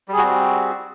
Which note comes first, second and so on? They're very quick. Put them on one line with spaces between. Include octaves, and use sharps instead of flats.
G3 G#4 F#4 C4